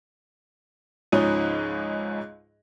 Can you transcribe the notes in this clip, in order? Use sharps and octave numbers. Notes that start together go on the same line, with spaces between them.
C#2 G#2 F3 C#4 D#4 D#5